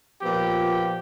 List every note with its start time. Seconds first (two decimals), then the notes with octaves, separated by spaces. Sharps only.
0.22 A#2 F3 B3 G4